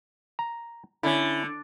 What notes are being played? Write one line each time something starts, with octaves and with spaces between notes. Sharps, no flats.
A#5
D3 C#4 E4